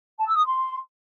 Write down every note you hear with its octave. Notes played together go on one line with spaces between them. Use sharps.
A5
E6
D#6
C6